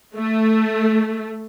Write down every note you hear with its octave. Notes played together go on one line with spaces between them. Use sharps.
A3